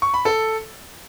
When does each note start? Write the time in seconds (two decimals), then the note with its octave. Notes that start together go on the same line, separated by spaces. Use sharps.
0.02 C#6
0.14 B5
0.25 A4